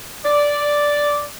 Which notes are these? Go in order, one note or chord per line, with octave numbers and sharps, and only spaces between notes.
D5